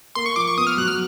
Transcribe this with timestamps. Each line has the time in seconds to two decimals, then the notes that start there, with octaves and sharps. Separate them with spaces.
0.15 A#3 C6
0.26 C#6
0.36 F3 D6
0.47 C#6
0.57 B3 D#6
0.67 F6
0.77 F#3 F#6
0.88 F6